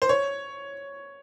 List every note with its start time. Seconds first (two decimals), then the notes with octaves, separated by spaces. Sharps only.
0.02 C5
0.09 C#5